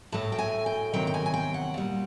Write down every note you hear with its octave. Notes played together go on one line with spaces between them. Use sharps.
A2 F#3 A3 A5
G5
G#5
G5
E2 C3 D#3 F#3 G5
G5
G#5
G#5
G5
F#5
A#2 G3